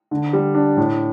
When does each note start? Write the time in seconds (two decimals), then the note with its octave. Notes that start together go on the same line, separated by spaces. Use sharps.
0.11 D3
0.33 G3
0.55 D4
0.77 A2